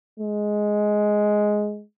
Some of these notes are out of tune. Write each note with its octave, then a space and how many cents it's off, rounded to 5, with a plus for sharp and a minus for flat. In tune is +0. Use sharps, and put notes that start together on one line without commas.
G#3 +5